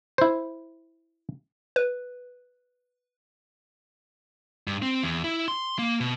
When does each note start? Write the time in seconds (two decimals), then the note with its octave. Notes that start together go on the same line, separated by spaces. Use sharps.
0.18 E4 C5
1.76 B4
4.67 G2
4.82 C4
5.03 E2
5.24 E4
5.48 C6
5.79 A#3
6.00 B2